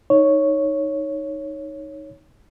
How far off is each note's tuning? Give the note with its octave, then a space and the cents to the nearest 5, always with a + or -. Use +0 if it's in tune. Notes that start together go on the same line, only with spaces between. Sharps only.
D#4 +0 C#5 +0